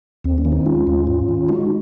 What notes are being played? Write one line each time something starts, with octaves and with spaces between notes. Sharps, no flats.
D#2 C4
A#3 C#4
D#3
C4 D#4
G#3 C#4 F4
D#2
G#2
D#3
G#3 D#4 F#4